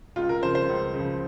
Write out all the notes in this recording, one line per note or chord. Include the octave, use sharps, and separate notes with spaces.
C#2 F4
A#4
C#3 F3 C5
C5
C#2
C#3 F3